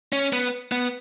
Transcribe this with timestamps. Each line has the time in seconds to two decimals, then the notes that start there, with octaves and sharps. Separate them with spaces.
0.13 C#4
0.33 B3
0.72 B3